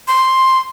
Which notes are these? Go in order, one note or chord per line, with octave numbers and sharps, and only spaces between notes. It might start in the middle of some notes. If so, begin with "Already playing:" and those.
C6